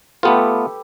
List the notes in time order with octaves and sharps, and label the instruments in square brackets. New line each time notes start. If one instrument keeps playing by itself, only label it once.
[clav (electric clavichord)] A3 B3 F4 [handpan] G4 A4 B4